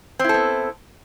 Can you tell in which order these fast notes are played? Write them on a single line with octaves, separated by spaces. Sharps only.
C4 E4 A4 B3